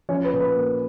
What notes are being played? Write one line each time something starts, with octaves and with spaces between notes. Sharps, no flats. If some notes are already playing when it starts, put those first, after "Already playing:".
F3 C#4 C#5
B4
A#2
B4
A#3